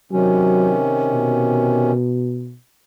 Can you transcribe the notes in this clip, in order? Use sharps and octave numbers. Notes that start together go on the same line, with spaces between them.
C3 D#3 F#3 C#4
B2